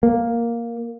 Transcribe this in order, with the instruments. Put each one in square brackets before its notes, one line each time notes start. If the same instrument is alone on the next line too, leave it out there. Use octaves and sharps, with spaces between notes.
[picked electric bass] A#3